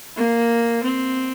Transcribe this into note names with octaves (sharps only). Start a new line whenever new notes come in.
A#3
C4